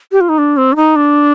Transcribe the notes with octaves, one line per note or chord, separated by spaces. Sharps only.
G4
F4
D#4
D4
C4
D4
D#4
D4